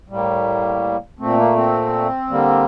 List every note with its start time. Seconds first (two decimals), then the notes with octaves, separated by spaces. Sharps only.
0.08 A2 G3 A#3
1.19 A#2 A3 C4
1.37 A#3
1.56 C4
2.30 D3 G3 A#3